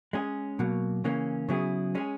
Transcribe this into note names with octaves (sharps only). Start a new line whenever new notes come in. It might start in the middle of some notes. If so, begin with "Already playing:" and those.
G#3 C#4 G#4
B2 F#3 A#3
C#3 E3 A#3 C#4
C#3 F#3 B3 E4 G#4
G#3 C#4 G#4